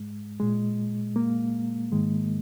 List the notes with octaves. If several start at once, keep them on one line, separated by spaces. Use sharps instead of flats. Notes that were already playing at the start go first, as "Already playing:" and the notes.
Already playing: G#2 G#3
A#2 G#3
A#3
G#2 D#3 G#3